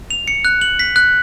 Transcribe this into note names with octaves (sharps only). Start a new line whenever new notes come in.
F7
C#7
F#6
F#7
B6
F#6